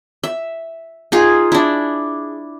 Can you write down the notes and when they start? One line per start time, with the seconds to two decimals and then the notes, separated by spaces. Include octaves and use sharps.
0.23 E5
1.12 D#4 F4 G#4
1.52 D4 E4